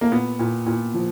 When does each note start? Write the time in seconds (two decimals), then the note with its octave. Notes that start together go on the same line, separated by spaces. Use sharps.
0.01 A#3
0.11 A#2 B3
0.39 A#2
0.66 A#2
0.94 F3